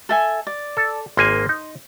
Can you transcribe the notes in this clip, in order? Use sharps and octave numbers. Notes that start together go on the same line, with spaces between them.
A4 E5 G#5
D5
A4
G#1 A#3 G#5 C6
D#4